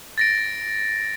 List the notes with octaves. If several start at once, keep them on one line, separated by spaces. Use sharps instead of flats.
A6 A#6 D7